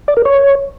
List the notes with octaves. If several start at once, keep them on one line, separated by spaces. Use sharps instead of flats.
D5
A#4
C#5